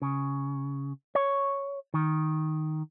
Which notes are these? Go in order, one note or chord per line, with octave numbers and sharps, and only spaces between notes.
C#3
C#5
D#3